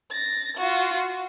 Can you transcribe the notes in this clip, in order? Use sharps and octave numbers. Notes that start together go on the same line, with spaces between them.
A6 A#6
F4 F#4
F#4